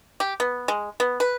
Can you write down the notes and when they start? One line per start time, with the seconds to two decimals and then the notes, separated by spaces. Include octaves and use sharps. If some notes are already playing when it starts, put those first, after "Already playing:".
0.20 G4
0.40 B3
0.68 G#3
1.00 B3
1.20 B4